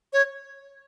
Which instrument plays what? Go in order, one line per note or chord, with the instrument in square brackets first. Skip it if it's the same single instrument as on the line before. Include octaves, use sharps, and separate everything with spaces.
[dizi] C#5